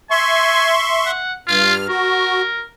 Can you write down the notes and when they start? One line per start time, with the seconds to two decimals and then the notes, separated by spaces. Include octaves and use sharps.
0.11 E5 G#5 C6 C#6
1.06 F#5
1.48 G2 F4 F6
1.89 F#4 A#4